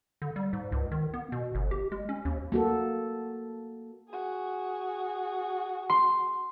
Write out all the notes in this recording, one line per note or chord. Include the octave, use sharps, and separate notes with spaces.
D3
G3
G#2
C#2
D#3
B3
B2
G1
G4
G#3
C#4
D#2
A#3 F#4 A4
F#4 G#4
C6